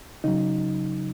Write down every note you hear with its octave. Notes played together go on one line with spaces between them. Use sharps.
C#3 F#3 D#4